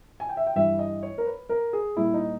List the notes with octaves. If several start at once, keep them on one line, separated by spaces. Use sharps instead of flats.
G#5
G5
E5
G5
G2 E3 G3 E5
D#5
C#5
A#4
B4
A#4
G#4
A#2 G3 E4
D#4